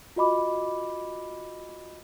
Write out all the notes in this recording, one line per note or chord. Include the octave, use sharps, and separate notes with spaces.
F4 F#4 D#5 B5 D6